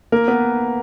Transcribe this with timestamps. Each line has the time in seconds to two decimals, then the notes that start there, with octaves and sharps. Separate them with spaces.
0.12 A#3 A#4
0.28 B3 B4